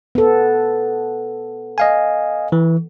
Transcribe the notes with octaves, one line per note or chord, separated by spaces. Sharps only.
B3 A4
D#5 F5 G#5
E3